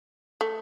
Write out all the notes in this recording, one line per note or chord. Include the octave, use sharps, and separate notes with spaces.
A3